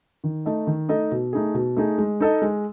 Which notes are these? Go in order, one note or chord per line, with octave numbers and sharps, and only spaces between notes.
D#3
A3 D#4 A4 D#5
D#3
A3 D#4 A4 D#5
B2
A3 D#4 G#4
B2
A3 D#4 G#4
G#3
D#4 A4 D#5
G#3